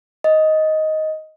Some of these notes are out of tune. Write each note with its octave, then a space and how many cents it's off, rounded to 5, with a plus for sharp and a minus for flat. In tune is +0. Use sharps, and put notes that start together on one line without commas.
D#5 +5